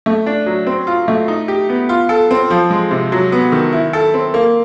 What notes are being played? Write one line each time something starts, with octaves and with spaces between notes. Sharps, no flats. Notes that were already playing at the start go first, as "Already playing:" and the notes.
A3
D4
F#3
C4
F4
A3
D#4
G4
B3
F4
A4
C4
F3
G#3
C3
F#3
B3
D#3
E4
A4
C4
A#3